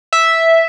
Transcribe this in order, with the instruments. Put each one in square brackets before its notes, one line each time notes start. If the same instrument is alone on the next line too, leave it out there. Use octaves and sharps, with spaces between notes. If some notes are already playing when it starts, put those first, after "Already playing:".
[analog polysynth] E5